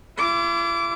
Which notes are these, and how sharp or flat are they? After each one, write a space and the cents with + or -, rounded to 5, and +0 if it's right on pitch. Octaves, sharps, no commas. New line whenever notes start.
E4 +45 D6 -20